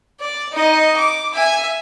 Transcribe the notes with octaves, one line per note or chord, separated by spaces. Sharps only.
D5
D#4 D#5
D6
E5 G#5